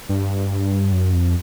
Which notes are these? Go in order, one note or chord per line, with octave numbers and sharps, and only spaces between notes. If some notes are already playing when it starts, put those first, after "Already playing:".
G2
F#2
F2